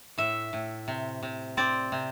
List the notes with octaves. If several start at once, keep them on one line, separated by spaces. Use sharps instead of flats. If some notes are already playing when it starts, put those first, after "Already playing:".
A2 E5
A2
C3
C3
C4 D5
C3